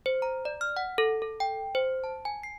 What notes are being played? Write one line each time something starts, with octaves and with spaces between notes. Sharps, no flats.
C5
A#5
D5
F6
F#5
A4
A4
G5
C5
A5
G#5
C7